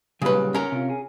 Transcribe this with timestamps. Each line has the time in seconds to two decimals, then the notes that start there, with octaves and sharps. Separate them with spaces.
0.22 A#2 C#3 F#3 G3 B4
0.54 C#4 A#4
0.72 C3 F4
0.90 G#4